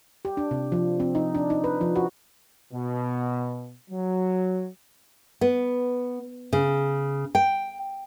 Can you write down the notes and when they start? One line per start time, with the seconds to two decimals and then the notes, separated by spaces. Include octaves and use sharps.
0.25 G4
0.37 D4
0.51 C3
0.72 F3
1.00 C4
1.15 D#4
1.35 D4
1.50 D#4
1.64 B4
1.81 F3
1.96 F#4
2.73 B2
3.90 F#3
5.41 B3
6.53 C#3
7.35 G5